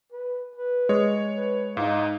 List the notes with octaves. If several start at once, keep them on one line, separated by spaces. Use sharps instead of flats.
B4
B4
G#3 C#5
B4
G#2 D#4 F5